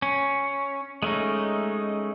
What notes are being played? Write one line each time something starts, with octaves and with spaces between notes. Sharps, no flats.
C#4
G#3 A3 C#4 D#4